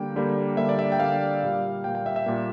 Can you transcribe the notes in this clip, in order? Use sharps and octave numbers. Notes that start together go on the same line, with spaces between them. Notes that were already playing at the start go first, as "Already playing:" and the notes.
Already playing: D3 G3 A#3 G5
D3 G3 A#3
D3 G3 A#3 E5
D5
E5
G5
D3 G3 A#3 F5
A#2 G3 A#3
A#2 G3 A#3 G5
G5
E5
E5
A#2 G3 A#3